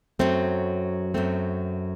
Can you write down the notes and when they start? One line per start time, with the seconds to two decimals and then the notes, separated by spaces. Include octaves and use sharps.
0.19 F#2 F#3 A3 C4
1.14 F#2 F#3 A3 C4